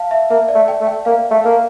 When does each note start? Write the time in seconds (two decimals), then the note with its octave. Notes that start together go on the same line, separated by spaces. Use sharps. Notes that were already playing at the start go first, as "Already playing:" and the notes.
Already playing: F5 A5
0.11 E5
0.30 A#3 E5
0.49 D5
0.55 A3
0.68 G5
0.81 A3
0.87 G5
1.05 A#3 F5
1.31 A3
1.44 A#3 F5